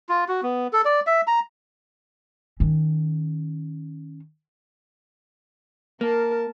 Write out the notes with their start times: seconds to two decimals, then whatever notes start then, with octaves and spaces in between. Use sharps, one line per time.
0.09 F4
0.28 F#4
0.43 B3
0.73 A4
0.85 D5
1.07 E5
1.27 A#5
2.60 D#3 C#4
6.01 A#3 A#4 A5